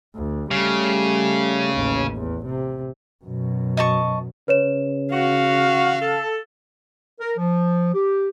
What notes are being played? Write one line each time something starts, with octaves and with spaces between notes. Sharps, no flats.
D2
C#3 G3 A3
A1 D#2
E2
C3
F#2 B2
D#5 A5 C#6
C#3 B4 C#5 E7
F#4 F5
A4
A#4
F3
G4